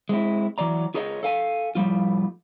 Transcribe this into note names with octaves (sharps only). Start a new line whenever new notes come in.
G#3 C4 E4
E3 F#3 D5 A#5
F4 G#4 A#4 C#5 D#5
A4 F5 G#5
A2 F3 G3 F4